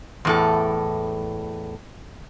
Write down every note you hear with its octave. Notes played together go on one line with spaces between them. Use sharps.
E2 A2 A4